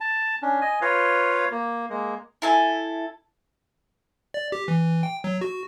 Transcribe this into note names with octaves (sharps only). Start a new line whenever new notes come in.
A5
C#4 D4
D#5 G#5
F4 B4 C#5 F5
A#3
G#3 A#3
E4 A4 G#5
D5
G4
E3
G5
F#3
F#4